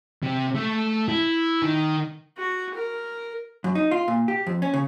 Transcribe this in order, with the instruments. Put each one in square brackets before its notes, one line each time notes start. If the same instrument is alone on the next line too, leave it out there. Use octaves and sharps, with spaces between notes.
[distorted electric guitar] C3
A3
E4
D#3
[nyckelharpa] F#4
A#4
[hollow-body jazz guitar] F#2
D#4
F4
A#2
G4
F2
C#4
C#3